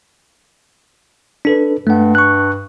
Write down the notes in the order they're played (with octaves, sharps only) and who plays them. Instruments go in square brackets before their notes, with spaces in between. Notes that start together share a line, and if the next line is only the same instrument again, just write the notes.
[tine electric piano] D4 A4 B4
[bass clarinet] G2 [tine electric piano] A3 F#5
[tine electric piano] C#6 F#6